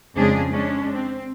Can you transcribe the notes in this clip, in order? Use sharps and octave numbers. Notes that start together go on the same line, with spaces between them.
F2 C#3 G#3 D4 G#4
G#3 C#4 D4
C4